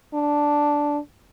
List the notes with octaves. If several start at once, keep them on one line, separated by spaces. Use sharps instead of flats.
D4